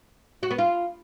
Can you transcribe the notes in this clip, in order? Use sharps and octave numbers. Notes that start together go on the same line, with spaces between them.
F#4
B3
F4